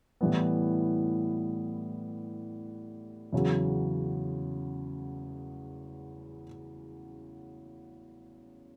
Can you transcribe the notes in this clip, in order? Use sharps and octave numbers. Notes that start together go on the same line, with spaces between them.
A2 E3 G3 B3
E2 C#3 F#3